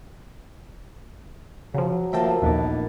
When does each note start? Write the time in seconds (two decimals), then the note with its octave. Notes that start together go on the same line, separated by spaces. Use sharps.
1.74 C#3 F3 F#3
2.13 F3 A3 A#3 E5 G5 A5
2.42 A#1 D#2 B3 D#4 D5